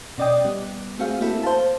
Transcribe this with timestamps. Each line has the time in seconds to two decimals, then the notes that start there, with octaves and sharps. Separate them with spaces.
0.18 B2 C#4 D5 D#5 G5 D#6
0.45 G3 B3
0.99 A3 C4 F#4 G#4 F5
1.20 A3 A#3 C4 E4 F#4 A4
1.43 C5 F5 A5